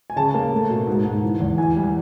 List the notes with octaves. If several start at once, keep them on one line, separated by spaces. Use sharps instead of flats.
G#5
C#3 A5
A#3
A3
B2
G#2
G#2
E3
E2
E3 G#5
G3